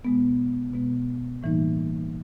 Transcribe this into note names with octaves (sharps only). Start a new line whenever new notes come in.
B2 G#3 B3
B2 G#3 B3
A2 E3 G3 A#3 D#4